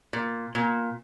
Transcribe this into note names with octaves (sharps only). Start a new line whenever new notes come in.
A#2
A#2